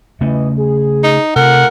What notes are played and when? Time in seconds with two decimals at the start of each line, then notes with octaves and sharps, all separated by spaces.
0.21 C#3 E3 A3 C#4 D#5
0.57 G#4
1.04 D#4
1.36 C3 A3 F4 A#4 F#5